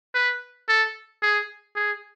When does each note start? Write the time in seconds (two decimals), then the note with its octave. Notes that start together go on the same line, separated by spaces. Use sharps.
0.15 B4
0.69 A4
1.22 G#4
1.76 G#4